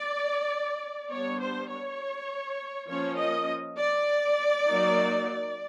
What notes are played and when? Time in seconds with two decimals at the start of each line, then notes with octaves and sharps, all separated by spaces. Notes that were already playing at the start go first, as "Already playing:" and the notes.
Already playing: D5
1.11 G3 B3 D4 C#5
1.40 C5
1.71 C#5
2.89 F3 A#3 C#4 C#5
3.17 D#5
3.77 D5
4.65 F#3 A#3 D#4